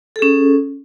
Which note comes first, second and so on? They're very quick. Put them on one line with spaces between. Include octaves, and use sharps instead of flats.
A4 G#4 C#4